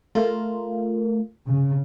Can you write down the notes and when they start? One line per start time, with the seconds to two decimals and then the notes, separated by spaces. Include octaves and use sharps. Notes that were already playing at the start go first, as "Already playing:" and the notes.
0.15 A3 F4 A#4
1.46 C#3